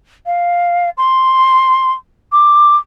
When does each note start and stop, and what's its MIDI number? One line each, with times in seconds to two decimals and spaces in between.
0.26 0.89 77
0.97 1.93 84
2.32 2.76 86